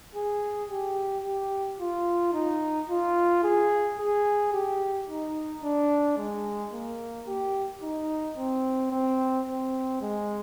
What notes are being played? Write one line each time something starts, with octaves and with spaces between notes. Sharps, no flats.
G#4
G4
G4
F4
D#4
F4
G#4
G#4
G4
D#4
D4
G#3
A#3
G4
D#4
C4
C4
C4
G#3